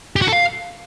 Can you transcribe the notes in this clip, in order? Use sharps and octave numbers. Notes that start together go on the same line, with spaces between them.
G4
F#4
A4
F5